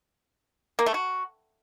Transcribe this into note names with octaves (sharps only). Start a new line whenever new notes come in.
A#3
A3
F#4